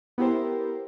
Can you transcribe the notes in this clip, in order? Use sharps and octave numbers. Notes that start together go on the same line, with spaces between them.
B3 E4 G4 A#4 C5